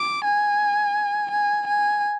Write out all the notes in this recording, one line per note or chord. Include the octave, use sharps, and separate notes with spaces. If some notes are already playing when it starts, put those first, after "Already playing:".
Already playing: D6
G#5
G#5
G#5